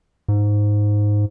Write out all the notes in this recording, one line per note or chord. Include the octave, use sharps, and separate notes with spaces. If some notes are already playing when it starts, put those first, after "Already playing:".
G#2